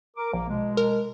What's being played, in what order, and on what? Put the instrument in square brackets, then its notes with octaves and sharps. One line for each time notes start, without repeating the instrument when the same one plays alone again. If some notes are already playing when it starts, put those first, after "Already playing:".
[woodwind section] A#4 D6
[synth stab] A#1 [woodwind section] A#3
[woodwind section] B2 G#3
[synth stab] A#4